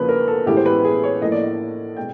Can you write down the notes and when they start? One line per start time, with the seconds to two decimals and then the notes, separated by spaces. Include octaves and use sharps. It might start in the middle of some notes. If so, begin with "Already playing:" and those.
Already playing: E2 C#3 F3 A#3 B4
0.09 A#4
0.28 A4
0.46 A2 E3 G#3 B3 G4
0.57 C5
0.66 B4
0.85 G#4
1.03 C#5
1.21 A2 F3 A#3 D#5
1.32 D5
1.42 D#5
1.97 B2 G#3 G5